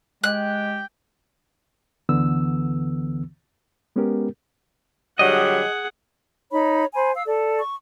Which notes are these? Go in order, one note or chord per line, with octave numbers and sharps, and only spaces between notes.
G#3 G4 G5 F#6
D2 D3 E3 B3 E6
G#3 B3 C#4 G4 A#4
D3 F#3 G3 G#4 D#5 F#5
D#4 C#5 B5
C5 G#5 B5
F5 E6
A4 D5
C#6